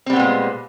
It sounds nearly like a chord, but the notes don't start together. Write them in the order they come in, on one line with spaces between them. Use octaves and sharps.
C4 G3 B3 A#2 G#3